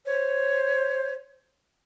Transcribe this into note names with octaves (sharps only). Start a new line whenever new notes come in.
C5 C#5